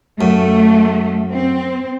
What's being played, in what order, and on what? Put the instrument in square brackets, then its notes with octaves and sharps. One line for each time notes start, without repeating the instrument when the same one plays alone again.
[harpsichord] F#2 [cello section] A3
[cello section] C4